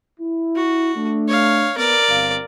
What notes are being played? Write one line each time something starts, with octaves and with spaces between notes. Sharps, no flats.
E4
F#4
A3 D4
C#5 F5
B3 A#4 D5
G1 C4 F5